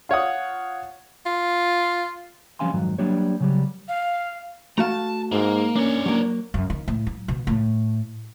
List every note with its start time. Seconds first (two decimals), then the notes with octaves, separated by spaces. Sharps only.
0.09 F4 C#5 F#5 D#6
1.26 F4
2.59 F3 G3 C#4 F5 G#5 C6
2.73 F2 G#2 D#3 F#3
2.99 F#3 G3 A#3 D4 G4 C#5
3.40 C#3 F#3 G3
3.88 F5
4.78 A3 F#4 F5 A5 A#5
5.32 G#2 A#3
5.76 A#3 C#4 D4 C#5
6.06 F#3 A#3
6.54 F#2
6.70 D#3
6.88 A2
7.07 F#3
7.28 B2
7.47 A2